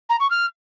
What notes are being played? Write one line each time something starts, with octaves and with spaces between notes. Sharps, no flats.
A#5
C#6
F6